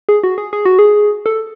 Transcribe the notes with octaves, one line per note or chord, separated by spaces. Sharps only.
G#4
F#4
G#4
G#4
F#4
G#4
A4